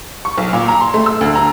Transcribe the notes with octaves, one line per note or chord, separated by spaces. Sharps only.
C#6
B1
A#2
A#5
C6
A3
E6
D2
A#5